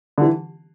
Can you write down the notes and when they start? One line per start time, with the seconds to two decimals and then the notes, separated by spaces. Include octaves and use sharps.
0.18 D3
0.22 E3